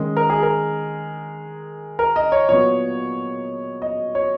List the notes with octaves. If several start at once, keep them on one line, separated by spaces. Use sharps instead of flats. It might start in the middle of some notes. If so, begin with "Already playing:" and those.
Already playing: D#3 G#3 C#4
A#4
G#4
A#4
A#4
D#5
C#5
A#2 F#3 B3 C#5
D#5
C#5